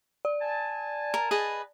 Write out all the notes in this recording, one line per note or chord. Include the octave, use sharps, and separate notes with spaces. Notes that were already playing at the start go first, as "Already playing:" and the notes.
D5
G#5 A5
A#4
G#4 B4 D#5